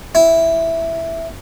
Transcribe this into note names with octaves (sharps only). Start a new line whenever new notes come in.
E4